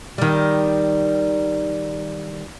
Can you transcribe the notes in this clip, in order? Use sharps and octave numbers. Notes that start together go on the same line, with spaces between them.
D#3 G3